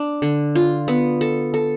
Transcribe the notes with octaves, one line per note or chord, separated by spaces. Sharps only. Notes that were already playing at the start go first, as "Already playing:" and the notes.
Already playing: D4
D3
F4
B3
A4
A4